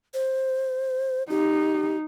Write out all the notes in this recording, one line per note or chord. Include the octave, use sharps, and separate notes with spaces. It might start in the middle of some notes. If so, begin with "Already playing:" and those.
C5
D#4 G4